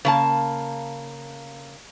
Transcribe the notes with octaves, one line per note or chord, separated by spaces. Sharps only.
C#3 A#3 A5